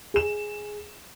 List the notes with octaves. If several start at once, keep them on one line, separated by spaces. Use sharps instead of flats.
G#4 E7